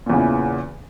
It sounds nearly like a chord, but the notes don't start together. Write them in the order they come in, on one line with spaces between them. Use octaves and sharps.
A#2 E2 C#3 E3